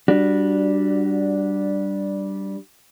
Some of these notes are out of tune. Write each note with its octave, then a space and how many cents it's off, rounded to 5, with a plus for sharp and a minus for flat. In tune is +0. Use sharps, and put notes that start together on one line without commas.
G3 -10 D4 +0 F#4 +0